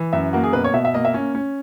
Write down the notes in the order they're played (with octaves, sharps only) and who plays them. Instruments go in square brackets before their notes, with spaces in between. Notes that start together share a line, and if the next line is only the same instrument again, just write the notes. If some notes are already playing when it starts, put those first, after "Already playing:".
Already playing: [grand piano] E3
F#2 E5
A#3 F#4
G#4
B2 B4
C#5
B2 E5
E5
A#3 D#5
E5
C#4
C#4